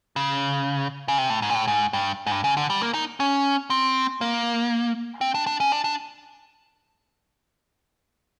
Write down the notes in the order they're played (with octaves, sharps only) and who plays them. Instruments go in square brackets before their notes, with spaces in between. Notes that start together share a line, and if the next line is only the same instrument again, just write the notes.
[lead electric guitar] C#3
C#3
C3
A2
G#2
A#2
A2
G#2
G2
G#2
G2
C#3
D3
G3
A#3
D#4
C#4
C4
A#3
C4
D4
D4
C#4
D4
D4